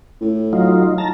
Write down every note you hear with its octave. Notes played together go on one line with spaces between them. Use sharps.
A2
F#3 D#4 F4
A5 A#5